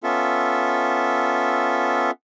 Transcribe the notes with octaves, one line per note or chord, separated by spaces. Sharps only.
B3 C#4 F4 A4 E5